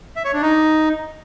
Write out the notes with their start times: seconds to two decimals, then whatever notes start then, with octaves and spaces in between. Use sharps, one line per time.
0.16 E5
0.25 C#5
0.33 D4
0.42 D#4